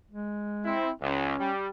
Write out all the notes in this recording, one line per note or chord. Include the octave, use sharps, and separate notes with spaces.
G#3
C4 E4
C#2 C#4
G3